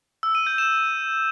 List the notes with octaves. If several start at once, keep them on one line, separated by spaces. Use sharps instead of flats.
E6
D#7
G6
E7